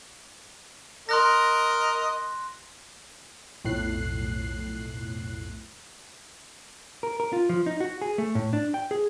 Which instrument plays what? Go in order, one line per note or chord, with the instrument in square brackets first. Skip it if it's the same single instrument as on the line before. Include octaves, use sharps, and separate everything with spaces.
[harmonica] A#4 D#5 [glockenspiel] C6 F#6 A#6
[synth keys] B1 F2 A2 F#6 C7
[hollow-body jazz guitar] A#4
A#4
F4
F3
D#4
F#4
G#4
A3
A2
D4
G5
G#4